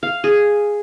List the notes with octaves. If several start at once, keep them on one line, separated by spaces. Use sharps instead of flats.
F5
G#4